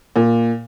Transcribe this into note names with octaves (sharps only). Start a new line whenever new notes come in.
A#2